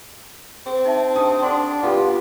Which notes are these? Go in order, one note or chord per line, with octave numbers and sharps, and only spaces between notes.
C4 G#4
D#4 E5 A5
D4 G4 A5 D#6
D4 A4 F#5 C6
B3 F4 G4